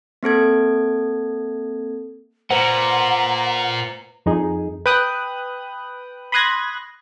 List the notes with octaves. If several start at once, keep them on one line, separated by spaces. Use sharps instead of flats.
A#3 C4 A4 G#6
A#2 B4 C5 F#5 A#5
F2 D#4 G#4
B4 G5 D#6 F#6
B5 C6 D#6 F#6 G#6 A#6